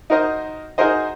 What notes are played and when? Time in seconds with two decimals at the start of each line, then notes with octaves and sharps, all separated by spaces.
0.10 D#4 F#4 A#4 C5 D#5
0.78 D#4 F#4 G#4 A#4 C5 D#5